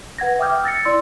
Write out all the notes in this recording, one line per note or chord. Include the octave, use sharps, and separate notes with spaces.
B4 F#5 G#6 A#6
E5 G5 D6 D#6 F6 G6
E6 A6 A#6 C#7
E4 D5 C6 E6